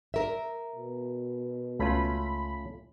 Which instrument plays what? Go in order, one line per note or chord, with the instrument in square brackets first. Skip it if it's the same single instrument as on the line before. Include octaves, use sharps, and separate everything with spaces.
[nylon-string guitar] A#4 E5
[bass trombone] B2
[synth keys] C#2 B5 [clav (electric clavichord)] A3 C#4 F4